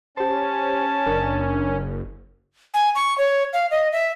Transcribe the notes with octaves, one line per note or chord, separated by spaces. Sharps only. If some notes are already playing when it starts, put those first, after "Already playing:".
C#4 G4 C5 A5
F#1 D4 A#4
G#5
C#6
C#5
F5
D#5
E5